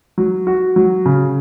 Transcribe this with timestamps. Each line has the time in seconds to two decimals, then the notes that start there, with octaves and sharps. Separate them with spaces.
0.18 F#3
0.47 F#4
0.76 F#3
1.06 C#3